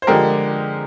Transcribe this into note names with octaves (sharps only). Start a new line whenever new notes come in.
C5
D3 F3 G#3 G4 A#4